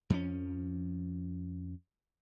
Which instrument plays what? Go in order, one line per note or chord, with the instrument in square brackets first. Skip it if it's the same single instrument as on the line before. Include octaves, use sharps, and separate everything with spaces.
[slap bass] F2 F3 F#3 C#4